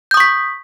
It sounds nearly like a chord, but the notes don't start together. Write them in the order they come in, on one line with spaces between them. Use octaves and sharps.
G6 D#6 C#6 B6